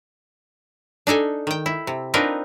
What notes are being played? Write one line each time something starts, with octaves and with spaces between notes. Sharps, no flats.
D4 D#4 A4 G#5
D#3 G5
E4
C3
C4 D4 D#4 F4 A#4 B4